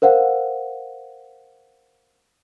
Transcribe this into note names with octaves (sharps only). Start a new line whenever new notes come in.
A#4 C5 F5 F#5